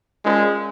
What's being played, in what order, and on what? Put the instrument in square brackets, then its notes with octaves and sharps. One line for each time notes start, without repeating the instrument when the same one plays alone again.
[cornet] G#3 [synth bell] C#4 F4 G#4 C5